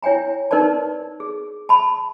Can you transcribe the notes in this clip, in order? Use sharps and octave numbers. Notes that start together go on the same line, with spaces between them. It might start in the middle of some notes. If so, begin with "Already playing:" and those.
E4 C#5 G5 G#5 A#5
D#4 A#4 B4 D5 A5
G#4
A5 B5